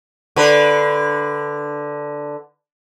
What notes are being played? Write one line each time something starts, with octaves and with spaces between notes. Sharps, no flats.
D3 B4